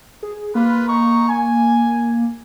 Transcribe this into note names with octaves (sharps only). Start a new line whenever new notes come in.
G#4
A#3 F4 B4
D#4 A#5 C#6
G#5